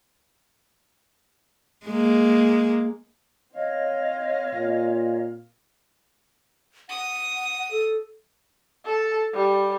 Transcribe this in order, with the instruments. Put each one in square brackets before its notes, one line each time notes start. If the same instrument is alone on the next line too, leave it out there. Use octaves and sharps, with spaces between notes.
[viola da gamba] G#3 A#3
[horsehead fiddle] C4 F5 [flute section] C#5 D#5
[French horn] A#2
[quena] F#5 [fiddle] D#6
[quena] A4
[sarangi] A4
G3